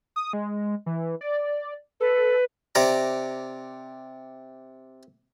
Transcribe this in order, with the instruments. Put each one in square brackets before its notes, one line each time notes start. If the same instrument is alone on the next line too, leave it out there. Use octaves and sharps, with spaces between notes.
[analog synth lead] D#6
G#3
E3
D5
[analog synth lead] A4 [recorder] B4
[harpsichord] C3 D5 A#5